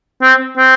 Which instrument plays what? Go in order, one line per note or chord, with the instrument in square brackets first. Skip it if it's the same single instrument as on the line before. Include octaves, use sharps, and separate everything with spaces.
[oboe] C4
C4